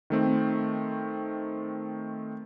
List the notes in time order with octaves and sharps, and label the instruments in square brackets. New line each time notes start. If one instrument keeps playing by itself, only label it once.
[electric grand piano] D#3 A3 C4